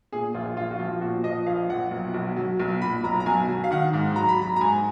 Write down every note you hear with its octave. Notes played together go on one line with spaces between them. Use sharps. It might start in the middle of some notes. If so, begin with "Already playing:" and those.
A#2 G#4
A#1 F4
A#1 F4
F#4
F3 F4
A#2 F#4
F3 D#5
A#1 F5
A#1 F#5
B1
B1
F#3
B1
A#2 B5
B1 A#5
A#5
B1 G#5
F#3
F5
D#3 F#5
G#2
F#3 A#5
B5
F#3 A#5
A#5
G#2 G#5